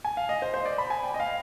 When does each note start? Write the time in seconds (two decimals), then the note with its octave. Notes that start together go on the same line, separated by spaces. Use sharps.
0.04 G#5
0.17 F5
0.29 D#5
0.42 C5
0.54 C5
0.66 D5
0.78 B5
0.90 G#5
1.03 G5
1.14 D#5
1.20 F5